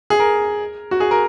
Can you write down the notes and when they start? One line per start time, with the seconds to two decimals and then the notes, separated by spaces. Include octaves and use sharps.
0.10 G#4
0.20 A#4
0.91 F#4
1.00 G#4
1.11 A#4